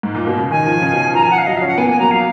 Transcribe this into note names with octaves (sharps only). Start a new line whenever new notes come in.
G#2
A#2
B2
C#3
D#3 G#5
F3
C#3
B2
F3 A#5
G#5
F#5
F5
F#3 D#5
F5
C#4
F#5
B3 G#5
A#3 G#5
F#3 A#5
F#3 F5